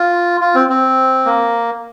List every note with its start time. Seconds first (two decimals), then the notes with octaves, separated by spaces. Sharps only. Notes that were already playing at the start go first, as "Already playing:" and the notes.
Already playing: F4
0.41 F4
0.55 C4
0.70 C4
1.26 A#3